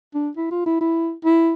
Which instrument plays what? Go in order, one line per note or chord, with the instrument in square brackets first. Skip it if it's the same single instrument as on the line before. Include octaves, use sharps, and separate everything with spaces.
[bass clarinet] D4
E4
F4
E4
E4
E4